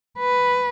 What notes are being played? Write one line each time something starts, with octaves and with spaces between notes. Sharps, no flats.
B4